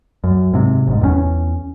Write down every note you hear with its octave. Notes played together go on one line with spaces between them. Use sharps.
F#2
G#2 C3
G1 F2 G#2
E2 F#3 C#4